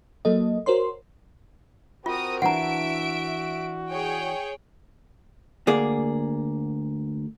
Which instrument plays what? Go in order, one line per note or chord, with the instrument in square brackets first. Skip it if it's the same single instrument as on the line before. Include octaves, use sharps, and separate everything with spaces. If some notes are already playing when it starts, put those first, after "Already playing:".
[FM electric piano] F#3 A#3 A4 D#5
F#4 A#4 C5 C#5 C6
[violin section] C4 A#4 D#6 [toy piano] F4 [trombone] F#4
[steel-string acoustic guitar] E3 D4 [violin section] E5 D7 [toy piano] F#5 A#5
[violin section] G#4 C#5 G5
[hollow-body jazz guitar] D2 A#3 G#4 D5